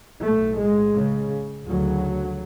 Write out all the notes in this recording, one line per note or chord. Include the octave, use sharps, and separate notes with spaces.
B1 A2 A3
G#3
C#3
D2 C#3 F#3